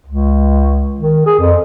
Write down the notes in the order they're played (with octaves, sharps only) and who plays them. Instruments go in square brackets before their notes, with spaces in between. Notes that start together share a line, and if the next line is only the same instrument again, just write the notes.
[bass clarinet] C#2
D#3
G#4
F2